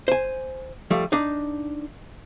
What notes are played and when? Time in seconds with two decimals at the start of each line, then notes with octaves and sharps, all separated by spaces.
0.08 C5 G#5
0.91 F3 G3 A3
1.12 D4 D#4